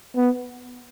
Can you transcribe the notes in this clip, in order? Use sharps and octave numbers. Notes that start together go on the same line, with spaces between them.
B3